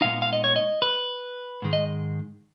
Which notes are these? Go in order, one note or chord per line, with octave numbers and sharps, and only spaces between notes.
A#2 G#3 B3 D#4 F5
F5
D#5
C#5
D#5
B4
G#2 D#3 G#3
D#5